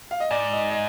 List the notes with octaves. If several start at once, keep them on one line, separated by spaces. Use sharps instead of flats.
F5
D#5
G#2 D5
D#5
D#5